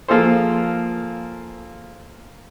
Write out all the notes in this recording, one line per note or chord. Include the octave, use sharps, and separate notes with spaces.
F3 A#3 F4 G#4 A4 C5